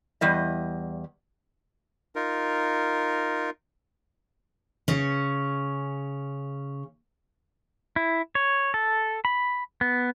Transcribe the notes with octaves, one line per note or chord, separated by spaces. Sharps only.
E2 G3 D#5
D#4 F4 A#4
C#3 C#4
E4
C#5
A4
B5
B3